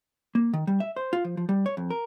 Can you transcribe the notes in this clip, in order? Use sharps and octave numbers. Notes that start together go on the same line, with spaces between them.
A#3
D#3
G3
E5
C5
F4
F3
F3
G3
C#5
F2
A#4